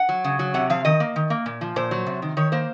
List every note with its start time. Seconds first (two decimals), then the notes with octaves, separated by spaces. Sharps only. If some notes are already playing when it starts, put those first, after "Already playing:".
Already playing: F#5
0.09 F#3
0.24 C#3
0.39 F#3
0.54 C3 F#5
0.70 F3 F5
0.85 D#3 D#5
1.00 A#3
1.16 D#3
1.30 A#3
1.46 A#2
1.61 F3
1.76 A#2 C5
1.91 F#3
2.07 C3
2.22 D#3
2.37 D#3 C#5
2.52 A#3 C5